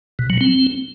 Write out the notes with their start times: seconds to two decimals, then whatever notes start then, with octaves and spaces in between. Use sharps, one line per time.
0.19 B2
0.30 F#3
0.41 C4